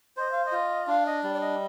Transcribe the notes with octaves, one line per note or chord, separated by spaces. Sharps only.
C5 D#5
F5
D#5
F4
D4 F5
D#5
G3 D5
D5
D#5